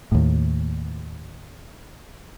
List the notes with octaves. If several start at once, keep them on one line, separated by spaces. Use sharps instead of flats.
D#2 A2